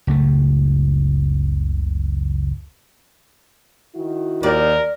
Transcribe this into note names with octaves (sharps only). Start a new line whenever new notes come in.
F#1 C#2 A3
D#3 E4 F#4
D#2 A#4 D5